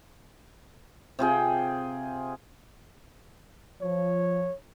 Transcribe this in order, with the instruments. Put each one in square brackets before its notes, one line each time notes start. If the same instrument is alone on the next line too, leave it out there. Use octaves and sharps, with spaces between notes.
[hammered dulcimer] C3 F4 G#4 G5
[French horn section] F3 [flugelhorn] C#5